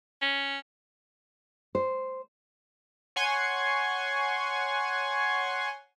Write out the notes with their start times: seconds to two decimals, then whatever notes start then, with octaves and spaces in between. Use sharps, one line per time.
0.22 C#4
1.75 C5
3.16 C#5 F#5 G#5 C6 C#6 G#6